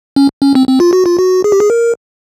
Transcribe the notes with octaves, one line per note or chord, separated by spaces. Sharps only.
C#4
C#4
C4
C4
F4
F#4
F4
F#4
G#4
G4
G#4
A#4